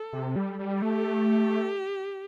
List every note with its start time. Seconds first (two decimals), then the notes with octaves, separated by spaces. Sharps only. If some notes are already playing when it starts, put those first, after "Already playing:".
Already playing: A4
0.13 C3
0.36 G3
0.59 G3
0.82 A3 G4